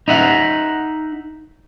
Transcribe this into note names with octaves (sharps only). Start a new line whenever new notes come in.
D#4 E5 F#5